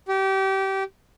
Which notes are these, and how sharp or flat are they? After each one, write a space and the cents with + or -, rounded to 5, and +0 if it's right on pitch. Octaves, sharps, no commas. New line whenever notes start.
G4 -25